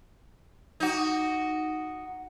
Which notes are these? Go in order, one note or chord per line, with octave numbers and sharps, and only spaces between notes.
D#4 F#4